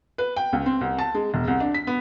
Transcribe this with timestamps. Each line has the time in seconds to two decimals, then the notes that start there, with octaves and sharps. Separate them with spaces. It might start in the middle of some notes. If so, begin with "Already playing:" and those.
0.18 B4
0.36 G5
0.53 C#2
0.66 C4
0.81 C2
0.98 A5
1.14 G#3
1.34 E1
1.47 C2
1.60 D4
1.74 B6
1.87 B3